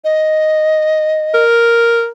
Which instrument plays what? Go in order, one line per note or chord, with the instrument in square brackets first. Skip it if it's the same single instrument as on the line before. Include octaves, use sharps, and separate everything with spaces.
[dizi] D#5
[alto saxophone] A#4